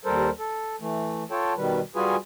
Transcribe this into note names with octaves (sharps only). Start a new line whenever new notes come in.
D#2 G3 A4 A#4 C5
A4
E3 A3
F4 A4 C#5 G5 A5
B2 D#3 G3 B4
G3 F4 F#4 G#4 B4 G#5